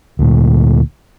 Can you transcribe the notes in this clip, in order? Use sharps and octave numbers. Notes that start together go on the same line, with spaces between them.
D2 A#2